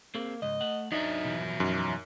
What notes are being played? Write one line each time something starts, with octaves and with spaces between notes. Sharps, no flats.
A#3 C4 G#4
C#2 G#2 D#5
A3 F#5
F#3 D4 D#4 E5
B2 E3 F3
F#2 D#4